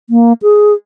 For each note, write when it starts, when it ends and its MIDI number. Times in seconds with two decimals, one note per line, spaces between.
0.10 0.33 58
0.42 0.73 68